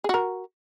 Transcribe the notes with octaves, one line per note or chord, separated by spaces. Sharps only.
F#4 G#4 A#4